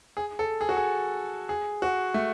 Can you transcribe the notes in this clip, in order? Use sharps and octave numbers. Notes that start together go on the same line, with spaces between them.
G#4
A4
G#4
F#4
G#4
G#4
F#4
A3